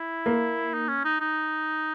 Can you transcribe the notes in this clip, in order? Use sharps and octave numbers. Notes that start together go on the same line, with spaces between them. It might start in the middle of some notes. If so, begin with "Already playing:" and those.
Already playing: E4
A#3
D#4
C#4
D#4
D#4